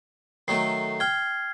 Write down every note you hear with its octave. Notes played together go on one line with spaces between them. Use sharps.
D#3 F#3 A3 C7
G5 F6 G#6